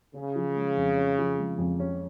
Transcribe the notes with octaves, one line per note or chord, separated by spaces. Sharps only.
C#3 C#4
F3
G#3
F2
C#4
F3
G#3
F2
C#4